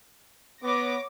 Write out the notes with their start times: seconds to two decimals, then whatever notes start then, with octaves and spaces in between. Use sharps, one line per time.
0.63 B3 C#5 D6 A#6